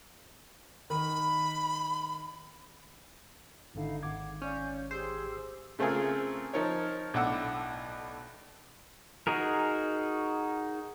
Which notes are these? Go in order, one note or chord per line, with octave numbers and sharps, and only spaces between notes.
D#3 B5
G#1 D3 D#4 E4 F5
G#1 F#5 D6 G#6
C#4 D5 F5 G6
G4 G#4 C5 E6
C#3 A3 C4 F4 G#4 A#4
F3 D#4 A#4 C#5
B1 A2 D4 F#5 D6 E6
D#4 F#4 G#4 A#4